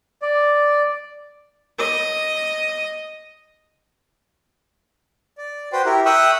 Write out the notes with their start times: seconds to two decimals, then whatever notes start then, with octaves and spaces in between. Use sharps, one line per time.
0.22 D5
1.79 D#5
5.38 D5
5.73 F#4 B4 C5 G5
5.85 E4 G4 A#4
6.06 E5 G5 C#6 D#6 E6 F#6